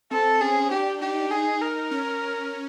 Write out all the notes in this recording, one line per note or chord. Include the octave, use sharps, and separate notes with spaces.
C4 A4
C#4 G#4
D4 G4
D#4 G4
D#4 G#4
A#4
C#4